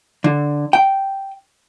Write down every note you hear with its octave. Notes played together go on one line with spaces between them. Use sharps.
D3
G5